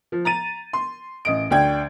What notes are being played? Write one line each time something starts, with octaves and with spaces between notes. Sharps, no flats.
F3
A#5 A6 D#7
C6
A1 D#5 D7
D2 D4 G5 G#6